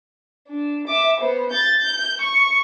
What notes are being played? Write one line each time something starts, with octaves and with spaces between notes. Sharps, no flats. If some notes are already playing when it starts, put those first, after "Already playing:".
D4
E5 D6
B3 C5
G6 A6
G6
C#6